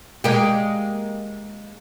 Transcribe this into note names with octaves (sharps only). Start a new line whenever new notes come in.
G#3 A#3 G4